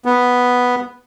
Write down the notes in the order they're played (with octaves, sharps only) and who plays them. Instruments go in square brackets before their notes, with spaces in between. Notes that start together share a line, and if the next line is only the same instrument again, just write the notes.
[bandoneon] B3